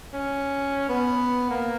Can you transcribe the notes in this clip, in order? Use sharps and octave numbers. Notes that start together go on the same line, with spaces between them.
C#4
B3
A#3